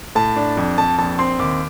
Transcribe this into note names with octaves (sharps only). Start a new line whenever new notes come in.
A2 A5
D4
F2
F2 A5
A#1 A5
C4 C6
D#2 D6